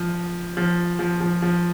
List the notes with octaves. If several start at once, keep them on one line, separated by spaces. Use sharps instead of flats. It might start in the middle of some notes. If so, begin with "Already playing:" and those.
Already playing: F3
F3
F3
F3
F3